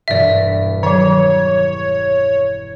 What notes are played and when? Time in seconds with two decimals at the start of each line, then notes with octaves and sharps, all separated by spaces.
0.08 E1 G2 D5 E5 A#6
0.83 D#3 F#3 C#5